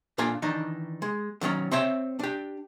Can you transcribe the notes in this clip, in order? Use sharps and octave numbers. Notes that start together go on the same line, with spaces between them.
A#2 D4 F4 A4 F5 G#5
D#3 E3 D4 D#4
G#3
D3 D#3 F#3 C#4
C4 C#5 E5 G5
D4 G4